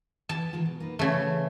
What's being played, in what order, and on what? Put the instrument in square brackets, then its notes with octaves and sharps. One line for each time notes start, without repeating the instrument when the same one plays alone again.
[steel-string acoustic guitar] E3 [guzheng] A5
[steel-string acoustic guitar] D#3 G#3 F4
B2
A#3 D#4 B4
[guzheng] C#3 A3 [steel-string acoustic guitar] E3